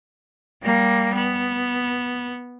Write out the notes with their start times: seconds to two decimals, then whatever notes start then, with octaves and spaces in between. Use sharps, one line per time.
0.62 G3 A#3
1.15 B3